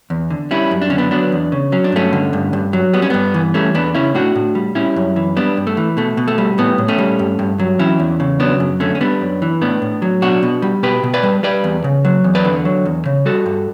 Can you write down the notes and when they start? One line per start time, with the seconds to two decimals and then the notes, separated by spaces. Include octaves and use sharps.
0.10 E2
0.30 D3
0.51 G3 C#4 E4
0.71 F#2
0.82 D4
0.90 D3 C#4
0.98 B3 D4
1.11 F#3 B3 D4
1.32 E2
1.52 C#3
1.72 F#3 C#4
1.84 D4
1.92 G2 A3 C#4
2.13 D3
2.33 G2
2.53 G2
2.73 F#3
2.93 G3 B3
3.02 C#4
3.10 G2 B3
3.34 E3
3.54 G3 A3 C#4
3.74 E2 B3 D4
3.95 C#3 C#4 E4
4.15 A2 D4 F#4
4.35 A2
4.55 G3
4.75 G3 C#4 E4
4.96 F#2
5.16 E3
5.36 G3 B3 D4
5.57 G2
5.67 A3
5.77 E3
5.97 B2 A3
6.17 B2
6.28 A3
6.38 G3
6.58 A2 B3
6.78 A2
6.88 A3 C#4
6.98 G3
7.19 G2
7.39 G2
7.59 F#3
7.79 E3 C#4 E4
8.00 E2
8.20 C#3
8.40 F#3 B3 D4
8.60 F#2
8.80 D3 A3 C#4
8.95 C#4
9.01 G3 B3 D4
9.21 F#2
9.42 E3
9.61 A2 B3 D4
9.82 A2
10.02 F#3
10.22 B2 D4 F#4
10.43 B2
10.62 G3
10.83 B2 G4 B4
11.03 B2
11.14 B4 D5
11.23 G3
11.43 G3 B4 D5
11.64 E2
11.84 C#3
12.05 F#3
12.24 E2
12.35 B4 D5
12.45 D3
12.65 F#3
12.85 E2
13.06 C#3
13.26 G3 F#4 A4
13.46 G2